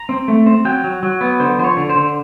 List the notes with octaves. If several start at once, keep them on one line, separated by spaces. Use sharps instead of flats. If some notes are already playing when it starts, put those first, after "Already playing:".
Already playing: A#5
C4
A3
C4
F#3 G5
F#3
F#3
B3
D3 C5
F3 C5
C#5
D3
C5
D3